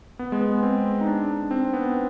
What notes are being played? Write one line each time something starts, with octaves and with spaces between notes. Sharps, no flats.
B3
G#3
B3
C4
D#4
D4
C4
B3